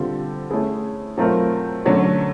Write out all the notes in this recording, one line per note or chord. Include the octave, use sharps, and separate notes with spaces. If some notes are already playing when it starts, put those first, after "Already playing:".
Already playing: D3 G3 C4 F4 A4
A3 C#4 E4 G#4
F#3 A3 C4 F4 A#4
D3 F#3 A3 C#4